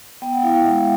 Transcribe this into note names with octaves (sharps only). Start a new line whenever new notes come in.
B3 G5
F#5
E4 F5
F5
G#3 E5